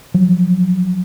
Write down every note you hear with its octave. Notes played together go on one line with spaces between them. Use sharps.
F3 F#3